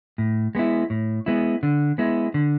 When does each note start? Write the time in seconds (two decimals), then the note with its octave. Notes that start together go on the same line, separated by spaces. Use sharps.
0.18 A2
0.55 G#3 B3 E4
0.90 A2
1.26 G#3 B3 E4
1.63 D3
1.98 G#3 B3 E4
2.34 D3